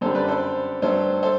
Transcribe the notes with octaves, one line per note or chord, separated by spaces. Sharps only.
F#2 D3 G3 A4 C5
B4 D5
A4 C5
G2 F#3 A3 A4 C5
A4 C5